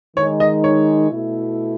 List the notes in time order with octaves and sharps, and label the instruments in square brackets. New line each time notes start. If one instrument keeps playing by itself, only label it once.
[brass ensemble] D#3 G#3 D#4 [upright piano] C#5
[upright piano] D#5
C#5
[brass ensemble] B2 A3 E4